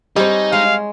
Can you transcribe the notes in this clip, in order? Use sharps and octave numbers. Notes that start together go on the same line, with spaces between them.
G3 C4 D#4 G#4 C#5
G#3 F5